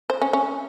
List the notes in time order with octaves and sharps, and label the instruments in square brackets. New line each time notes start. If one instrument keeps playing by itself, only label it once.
[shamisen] C5
C#4
C#4